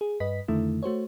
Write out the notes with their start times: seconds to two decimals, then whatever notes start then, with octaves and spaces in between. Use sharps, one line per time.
0.01 G#4
0.20 G2 B4 D#5 B6
0.48 F2 D3 D#3 A3 E4
0.83 A3 F#4 C5 C#5